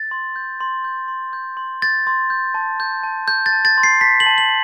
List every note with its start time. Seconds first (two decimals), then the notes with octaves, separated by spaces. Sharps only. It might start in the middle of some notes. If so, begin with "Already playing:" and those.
Already playing: A6
0.11 C6
0.36 G6
0.61 C6
0.85 G6
1.08 C6
1.33 G6
1.57 C6
1.82 G6 A6
2.07 C6
2.30 G6
2.54 A5
2.80 G6
3.04 A5
3.28 G6
3.46 A6
3.53 A5
3.65 A6
3.78 C6
3.83 C7
4.01 A5 B6
4.20 F#7
4.26 A5
4.38 F#7